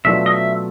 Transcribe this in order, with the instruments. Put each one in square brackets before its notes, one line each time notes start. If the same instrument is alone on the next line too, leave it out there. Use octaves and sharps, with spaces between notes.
[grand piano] B2 F#3 A3 D4 F4 [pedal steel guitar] E5
[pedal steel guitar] D#5
E5